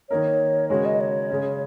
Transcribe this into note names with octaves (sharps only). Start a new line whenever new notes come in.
D#3 A#3 D#4 A#4 C#5
C#3 G#3 F#4 A#4 C#5
D#5
C#5
C#3 G#3 C#4